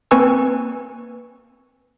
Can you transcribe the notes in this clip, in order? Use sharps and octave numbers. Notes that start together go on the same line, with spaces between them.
A#3 C4 B4 G#5 C#6 E6